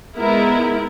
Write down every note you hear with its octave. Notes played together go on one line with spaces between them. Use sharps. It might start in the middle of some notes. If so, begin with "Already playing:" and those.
G#3 B3 E4 A#4